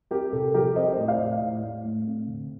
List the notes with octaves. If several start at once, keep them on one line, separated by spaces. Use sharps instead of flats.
C4 G4 A#4
C3 A4
F3 G4 A#4
C4 C5 D#5
A2 C5 D#5
D5 F5
A2
A2
A2
A3
C4
D3